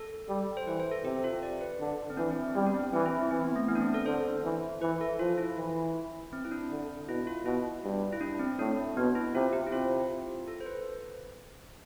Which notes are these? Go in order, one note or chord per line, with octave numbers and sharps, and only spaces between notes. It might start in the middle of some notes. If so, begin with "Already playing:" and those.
Already playing: A4
G3
C5
E3 B4
C5
A4
C3 G4
F4
D5
B4
D3
C4
E3 D4
C4
C4
G3 B3
D4
C4
E3 C4
E4
C4
E3 C4
B3
A3
E3 B3
D4
C4
A4
D3 C5
E3
E3 B4
A4
F3 F4
E4
E3
C4
E4
D4
D3
B2 E4
F4
B2 E4
G2
E4
D4
C4
A2 D4
B2 B3
E4
C3 F4
G4
E4
C3 F4
A4
C5
B4